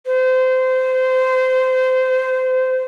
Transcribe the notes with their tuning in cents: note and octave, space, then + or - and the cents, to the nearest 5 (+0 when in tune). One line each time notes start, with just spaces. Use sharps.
C5 -25